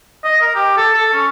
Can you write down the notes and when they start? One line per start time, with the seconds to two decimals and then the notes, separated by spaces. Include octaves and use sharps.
0.24 D#5
0.42 A#4
0.55 G4
0.77 A4
0.94 A4
1.13 C#4